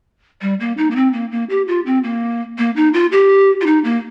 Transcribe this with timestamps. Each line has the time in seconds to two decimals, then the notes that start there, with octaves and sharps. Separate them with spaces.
0.41 G3
0.60 A#3
0.77 D#4
0.91 A#3
0.96 C4
1.13 A#3
1.32 A#3
1.50 G4
1.68 F4
1.86 C4
2.04 A#3
2.58 A#3
2.76 D#4
2.94 F4
3.12 G4
3.61 F4
3.66 D#4
3.84 A#3